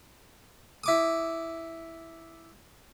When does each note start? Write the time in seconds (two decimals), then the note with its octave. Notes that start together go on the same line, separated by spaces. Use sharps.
0.84 E4 D6 D#6